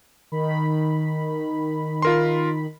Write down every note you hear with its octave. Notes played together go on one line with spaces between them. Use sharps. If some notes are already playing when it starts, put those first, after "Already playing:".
D#3 B5
F4 A#4 C6